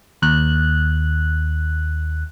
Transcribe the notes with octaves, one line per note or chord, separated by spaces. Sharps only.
D#2 F#6